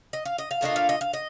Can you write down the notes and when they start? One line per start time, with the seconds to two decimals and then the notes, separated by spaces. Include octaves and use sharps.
0.13 D#5
0.25 F5
0.38 D#5
0.51 F5
0.61 A#2 A3 D4 F4 D#5
0.76 F5
0.89 D#5
1.01 F5
1.13 D#5